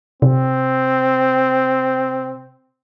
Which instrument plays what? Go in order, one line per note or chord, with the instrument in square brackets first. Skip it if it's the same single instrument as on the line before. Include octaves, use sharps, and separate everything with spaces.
[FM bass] C3 [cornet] C4